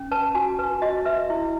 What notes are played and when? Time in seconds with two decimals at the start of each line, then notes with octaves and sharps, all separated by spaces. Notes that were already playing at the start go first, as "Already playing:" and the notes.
Already playing: C#4
0.11 B4 A5
0.35 F#4 G#5
0.59 B4
0.82 F#4 D#5
1.05 B4 E5
1.30 E4